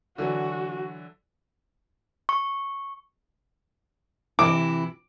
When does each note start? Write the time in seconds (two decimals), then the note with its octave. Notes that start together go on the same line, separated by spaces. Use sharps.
0.18 D3 E3 F#3 F#4
2.29 C#6
4.39 C3 E3 E4 D6